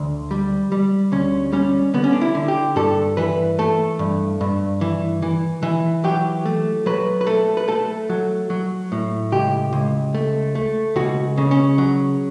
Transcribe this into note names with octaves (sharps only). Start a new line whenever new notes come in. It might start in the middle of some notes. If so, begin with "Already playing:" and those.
Already playing: D2
G3
G3
D2 C#4
G3 C#4
D3 B3
C#4
D4
E4
D3
G4
G2 A4
E3 B4
A3 A4
G2
G2
E3
E3
E3
F#3 G4
A3
F#3 B4
B4
A3 A4
B4
A3 A4
F#3
F#3
A2
C#2 G4
C#2
A3
A3
C#2 F#4
C#3
C#4
F#3